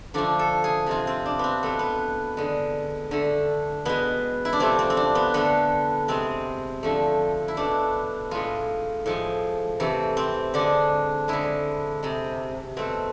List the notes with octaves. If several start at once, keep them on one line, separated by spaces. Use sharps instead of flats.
D3 F3 A3 D4
A4
G#4
C3 G#3 F4
C4
D4
B3 C4
B2 A3 B3
B3
D3 G#3
D3 A3
B2 G#3 B3
E4
D4
C3 F3 A3 C4
C4
C4
D4
B3
D3 A3 B3
C3 G#3 C4
D3 F3 A3
E4
B2 A3 D4
A2 G#3 F4
A2 F3 G#3
C3 E3 A3
C4
D3 G#3 D4
D3 G#3 E4
C3 G#3
B2 A3 C4